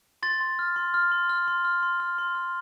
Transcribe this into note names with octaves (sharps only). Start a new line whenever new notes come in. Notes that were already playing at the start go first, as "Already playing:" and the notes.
C6 A6
C6
F6
C6
F6
C6
F6
C6
F6
C6
F6
C6
F6